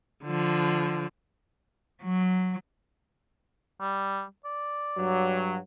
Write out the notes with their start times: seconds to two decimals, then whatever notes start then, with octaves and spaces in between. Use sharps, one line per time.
0.23 D3 F3
2.03 F#3
3.81 G3
4.45 D5
4.96 G2 F#3